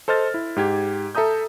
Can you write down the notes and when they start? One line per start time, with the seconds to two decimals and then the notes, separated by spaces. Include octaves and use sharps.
0.08 A4 C5 D#5 F6 A6
0.34 E4
0.56 G#2 G4 G#6
1.15 A4 E5 A#5 D#6 G6